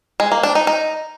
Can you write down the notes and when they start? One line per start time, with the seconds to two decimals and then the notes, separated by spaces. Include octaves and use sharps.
0.20 G#3
0.32 A#3
0.43 D4
0.55 D#4
0.67 D#4